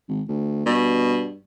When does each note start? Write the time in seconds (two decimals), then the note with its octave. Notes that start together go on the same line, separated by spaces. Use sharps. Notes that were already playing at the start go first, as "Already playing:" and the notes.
0.09 G#1
0.28 D2
0.66 G2 B2